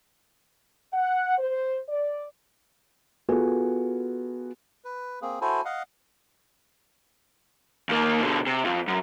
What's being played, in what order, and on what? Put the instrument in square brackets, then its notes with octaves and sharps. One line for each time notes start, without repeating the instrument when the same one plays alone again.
[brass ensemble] F#5
C5
D5
[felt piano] B3 F4 F#4 G#4 A4 G#5
[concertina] B4
A#3 C4 G#4
E4 F#4 A4 C5 G#5
D#5 F5 F#5
[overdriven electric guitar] D#2 A#3
B2 D3
C3
F2
F#2